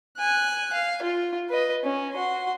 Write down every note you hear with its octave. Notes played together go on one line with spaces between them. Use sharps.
G#5 F#6
F5
F4
B4 D#5
C#4
F#4 C6